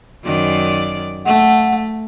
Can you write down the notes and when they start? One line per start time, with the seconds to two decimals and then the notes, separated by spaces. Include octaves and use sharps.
0.24 F#2 D#3 D5
1.25 A3 F#5